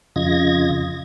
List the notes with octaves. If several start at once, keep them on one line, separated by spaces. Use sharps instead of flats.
F2 C#3 F4 D#5 G#6 A#6